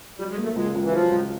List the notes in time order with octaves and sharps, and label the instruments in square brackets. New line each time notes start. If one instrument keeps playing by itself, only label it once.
[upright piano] F#3 [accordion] G3
[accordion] G#3
[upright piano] A#3
[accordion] A3
[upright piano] C#2 [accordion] G#3
[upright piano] C#2
[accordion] E3
[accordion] F3 [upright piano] F#3
[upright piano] C#2